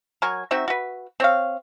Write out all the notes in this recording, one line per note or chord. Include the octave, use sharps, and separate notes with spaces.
F#3 A#4 G#5 C#6
C4 D#4 F#4 E5
F#4 B4
C4 C#5 F5